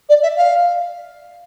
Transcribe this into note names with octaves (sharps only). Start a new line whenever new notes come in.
D5
E5
F5